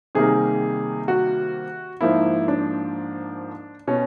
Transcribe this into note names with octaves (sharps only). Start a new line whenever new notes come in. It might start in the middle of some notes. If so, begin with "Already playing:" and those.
C3 D#3 G3 A#3 G#4
F#4
G#2 F3 A#3 E4
D4
B2 C#4